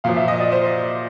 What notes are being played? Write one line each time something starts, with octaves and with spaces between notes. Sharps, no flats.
A#2 F3 F5
E5
D#5
D5
C5